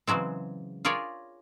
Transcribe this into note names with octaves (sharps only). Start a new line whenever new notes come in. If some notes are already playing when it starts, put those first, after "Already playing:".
C#3 E3 F#3 G#3 C4
F4 G#4 A#4 C#5 D5 G#5